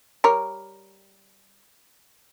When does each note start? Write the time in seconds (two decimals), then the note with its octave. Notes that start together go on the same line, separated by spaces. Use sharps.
0.24 G3 A#4 C#5